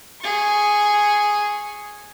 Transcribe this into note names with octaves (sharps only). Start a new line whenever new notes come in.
G#4 C#6